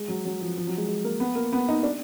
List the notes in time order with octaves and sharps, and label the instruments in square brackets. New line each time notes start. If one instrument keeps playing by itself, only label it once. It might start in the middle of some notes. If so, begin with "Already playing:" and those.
Already playing: [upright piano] G#3
F#3
F#3
F3
F3
F#3
G#3
G#3
A#3
B3
A#3
B3
D#4
D4